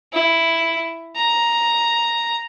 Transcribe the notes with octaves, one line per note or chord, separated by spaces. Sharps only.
E4
A#5